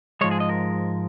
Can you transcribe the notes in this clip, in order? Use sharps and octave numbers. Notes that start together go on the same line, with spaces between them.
G#2 F3 G#3 C#5
G#4
D#5
A#4